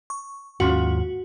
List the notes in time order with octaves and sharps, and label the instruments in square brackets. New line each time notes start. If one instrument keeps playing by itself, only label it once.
[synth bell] C#6
[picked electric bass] D#2 G#2 [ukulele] C#4 F4 F#5 [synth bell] F#4